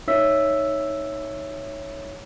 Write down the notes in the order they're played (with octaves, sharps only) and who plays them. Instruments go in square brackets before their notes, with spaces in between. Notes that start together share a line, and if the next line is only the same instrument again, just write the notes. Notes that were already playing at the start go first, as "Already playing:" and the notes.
[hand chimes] D#4 C#5 E5 E6 B6